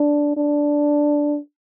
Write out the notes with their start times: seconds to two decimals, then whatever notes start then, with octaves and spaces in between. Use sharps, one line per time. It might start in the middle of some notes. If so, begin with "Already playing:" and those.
Already playing: D4
0.37 D4